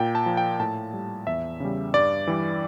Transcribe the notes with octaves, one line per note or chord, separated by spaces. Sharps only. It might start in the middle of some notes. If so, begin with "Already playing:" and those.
Already playing: A#2 G5
A5
F3
G5
A2 A5
G3
E2 E5
C#3 G3
G2 D5
E3 G3